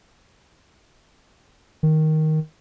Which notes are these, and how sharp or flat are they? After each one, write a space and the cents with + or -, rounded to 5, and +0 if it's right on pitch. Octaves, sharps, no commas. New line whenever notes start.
D#3 +5